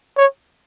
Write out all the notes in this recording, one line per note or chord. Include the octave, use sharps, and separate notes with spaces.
C#5